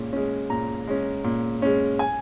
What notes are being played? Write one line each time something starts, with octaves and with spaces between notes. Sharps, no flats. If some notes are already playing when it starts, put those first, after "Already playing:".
Already playing: A#2 G#3 C#4
G#3 C#4
A#2 A#5
G#3 C#4
A#2
G#3 C#4
G#5